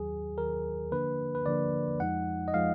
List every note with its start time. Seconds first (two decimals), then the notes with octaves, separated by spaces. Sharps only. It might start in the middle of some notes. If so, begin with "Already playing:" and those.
Already playing: D#2 D#3 F#3 G#4
0.38 D#2 D#3 F#3 A#4
0.92 D3 F3 A#3 D4 B4
1.35 B4
1.46 D3 F3 A#3 D4 D5
2.00 F2 F3 G#3 D#4 F#5
2.48 D#5
2.54 F3 G#3 D#4 F5